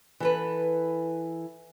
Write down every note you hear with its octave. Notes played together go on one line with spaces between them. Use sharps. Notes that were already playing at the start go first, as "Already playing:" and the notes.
E3 A4 B4